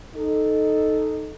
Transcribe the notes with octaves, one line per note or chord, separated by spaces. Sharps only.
D#4 A4